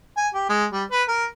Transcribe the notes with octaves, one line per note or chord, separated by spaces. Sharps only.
G#5
G4
G#3
G3
B4
A#4